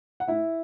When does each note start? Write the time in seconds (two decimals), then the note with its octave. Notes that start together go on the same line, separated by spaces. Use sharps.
0.20 F#5
0.28 A2 E4 E5